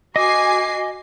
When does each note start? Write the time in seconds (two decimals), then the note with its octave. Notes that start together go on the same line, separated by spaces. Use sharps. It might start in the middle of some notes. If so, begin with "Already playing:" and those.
0.16 F#4 D#5 G#5 D6 C7